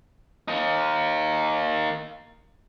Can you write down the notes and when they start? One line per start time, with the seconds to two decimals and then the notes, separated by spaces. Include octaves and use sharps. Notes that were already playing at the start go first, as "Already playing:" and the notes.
0.48 A#3 D#4